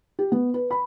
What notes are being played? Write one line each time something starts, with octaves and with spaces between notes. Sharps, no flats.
G4
B3
B4
B5